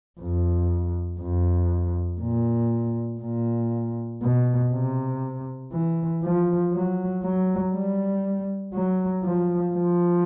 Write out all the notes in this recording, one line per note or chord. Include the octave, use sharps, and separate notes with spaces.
F2
F2
A#2
A#2
B2
C3
E3
F3
F#3
F#3
G3
F#3
F3
F3